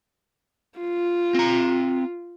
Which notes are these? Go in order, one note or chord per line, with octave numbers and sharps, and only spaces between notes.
F4
C4 A#5